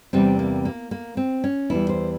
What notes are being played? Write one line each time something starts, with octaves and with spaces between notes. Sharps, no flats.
E2 C3 G3 C4
A#3
A#3
A#3
C4
C#4
E2 E3 G3 E4
C5